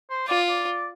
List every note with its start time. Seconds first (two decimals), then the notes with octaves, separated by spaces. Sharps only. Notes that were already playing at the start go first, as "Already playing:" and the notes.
0.10 C5
0.28 F4 D5
0.49 D5